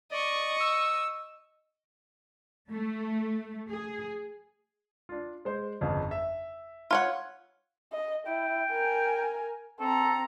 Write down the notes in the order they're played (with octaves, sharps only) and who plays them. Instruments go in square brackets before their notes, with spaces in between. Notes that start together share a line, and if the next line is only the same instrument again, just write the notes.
[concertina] D5 [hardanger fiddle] D#5 C#6
[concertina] E6
[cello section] A3
G#4
[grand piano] D4 F4
G#3 C5
G1 F2 C#3
E5
[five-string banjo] F4 C#5 F#5
[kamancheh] D#5
[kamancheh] E4 [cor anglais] G5
[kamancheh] A#4 G#5
[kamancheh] C4 A#5 [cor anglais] A4